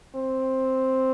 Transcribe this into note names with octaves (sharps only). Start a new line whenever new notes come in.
C4